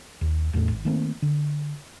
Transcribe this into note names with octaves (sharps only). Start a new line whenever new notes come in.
D#2
E1 E2 A2 A3
G#1
D#3 A3 A#3 C4
D3